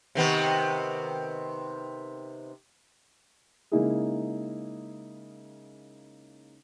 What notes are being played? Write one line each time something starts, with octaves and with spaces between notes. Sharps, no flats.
C3 D#3 B3
C#3 G#3 A#3 D#4 E4 G#4